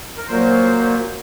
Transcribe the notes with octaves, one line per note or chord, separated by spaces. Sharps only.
A#4
A#2 F#3 A#3 C5